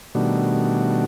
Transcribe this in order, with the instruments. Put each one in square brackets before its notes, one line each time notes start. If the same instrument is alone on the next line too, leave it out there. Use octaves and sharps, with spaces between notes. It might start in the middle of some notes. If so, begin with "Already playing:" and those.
[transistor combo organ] B2 D#3 G3 A3 D4 F#4